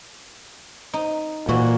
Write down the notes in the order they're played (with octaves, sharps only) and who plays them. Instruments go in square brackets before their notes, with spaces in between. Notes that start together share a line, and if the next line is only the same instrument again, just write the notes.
[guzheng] D#4
[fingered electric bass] A#2 [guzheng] E3 F#4